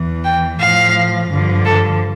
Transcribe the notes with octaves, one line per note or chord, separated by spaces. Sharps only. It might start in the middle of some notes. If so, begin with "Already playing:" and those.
Already playing: E2 E3
G5
A2 F3 F5
G2 D3 F3
A4